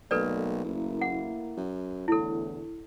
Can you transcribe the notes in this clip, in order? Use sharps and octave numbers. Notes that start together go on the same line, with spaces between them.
B1 A3 A#3 A4 B4 D5
F#1 A2 A#3 E4
F#5
F#2
E2 A2 D3 E4 A4